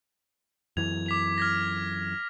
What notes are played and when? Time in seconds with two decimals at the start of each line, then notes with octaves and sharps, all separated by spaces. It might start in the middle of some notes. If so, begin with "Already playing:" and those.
0.77 F#2 E3 G#6 F7
1.06 D6 B6 F7
1.38 F6 G#6 A#6